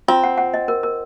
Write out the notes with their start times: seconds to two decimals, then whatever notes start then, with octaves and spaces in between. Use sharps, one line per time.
0.08 C4 F4
0.23 F#5
0.38 F#5
0.54 D#5
0.68 A#4
0.83 A#4